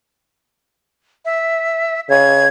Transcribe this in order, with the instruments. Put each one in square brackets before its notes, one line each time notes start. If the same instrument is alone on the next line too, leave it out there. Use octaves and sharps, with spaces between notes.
[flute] E5
[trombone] C#3 [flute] G#6